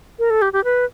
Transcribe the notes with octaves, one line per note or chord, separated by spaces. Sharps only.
A#4
A4
G4
G4
B4